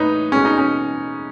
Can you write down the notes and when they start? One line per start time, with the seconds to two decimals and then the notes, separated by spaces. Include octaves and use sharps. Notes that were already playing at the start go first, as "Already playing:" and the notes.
Already playing: A2 D#4 B4 C#5
0.32 B2 G#3 C#4
0.45 D#4
0.58 C#4